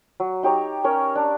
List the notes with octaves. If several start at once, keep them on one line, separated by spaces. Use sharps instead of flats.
F#3
D#4 G4 C#5 A#5
C#4 A#4 C#5
D4